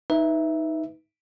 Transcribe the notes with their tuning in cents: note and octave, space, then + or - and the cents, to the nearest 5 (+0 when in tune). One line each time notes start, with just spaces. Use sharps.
D#4 +15 B4 +0 E5 +0